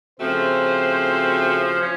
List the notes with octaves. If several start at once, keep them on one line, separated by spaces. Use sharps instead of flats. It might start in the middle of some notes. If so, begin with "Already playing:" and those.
C#3 F3 A3 C4 F#4 C5
F3 C#4